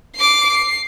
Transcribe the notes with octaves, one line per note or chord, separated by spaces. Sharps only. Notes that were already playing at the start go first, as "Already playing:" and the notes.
D6 C7
C7